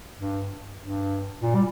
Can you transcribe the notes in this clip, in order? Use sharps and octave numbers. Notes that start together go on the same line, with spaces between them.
G2
G2
A#2
G3